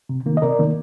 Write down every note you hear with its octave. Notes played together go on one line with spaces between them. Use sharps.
C3
D#3 A#3
D#5
C3 A#4 D5
D#3 A#3